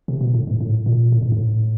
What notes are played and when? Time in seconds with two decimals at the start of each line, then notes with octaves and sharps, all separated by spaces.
0.08 C3
0.21 B2
0.34 A2
0.47 G#2
0.60 A2
0.86 A#2
1.12 A2
1.22 G#2
1.32 A2